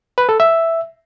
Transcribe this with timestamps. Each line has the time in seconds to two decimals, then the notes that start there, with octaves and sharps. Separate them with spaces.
0.18 B4
0.29 A4
0.40 E5